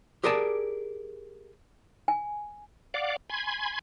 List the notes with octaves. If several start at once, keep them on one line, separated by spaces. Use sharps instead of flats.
G4 G#4 A#4 D5 G#5 A5
G#5
D5 F5 F#5 D6
G#5 B5 C6 G#6